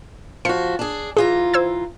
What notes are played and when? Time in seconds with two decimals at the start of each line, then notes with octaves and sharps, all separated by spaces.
0.45 F3 F#4 C#7
0.79 D4 G#4
1.17 E3 F4 G#4 A#5
1.54 C5 E6 G#6